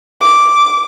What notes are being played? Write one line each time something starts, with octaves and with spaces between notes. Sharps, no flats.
D6